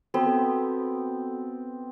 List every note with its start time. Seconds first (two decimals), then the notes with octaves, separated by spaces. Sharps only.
0.14 B3 C4 F#4 A4